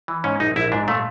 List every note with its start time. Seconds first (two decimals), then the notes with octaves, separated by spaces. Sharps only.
0.08 E3
0.24 G#2 C#4
0.40 A#1 D#4
0.56 A#1 E4
0.72 G#2 D4
0.88 A#2 A3